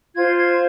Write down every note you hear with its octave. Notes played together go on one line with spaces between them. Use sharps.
F4 C5 G#6
G#6